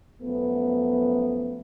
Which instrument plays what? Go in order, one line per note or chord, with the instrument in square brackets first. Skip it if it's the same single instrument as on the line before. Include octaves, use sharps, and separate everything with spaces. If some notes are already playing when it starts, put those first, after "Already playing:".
[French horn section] F#2 F3 A3 B3